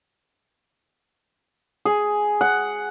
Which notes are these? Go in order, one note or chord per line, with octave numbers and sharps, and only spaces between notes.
G#4
F#5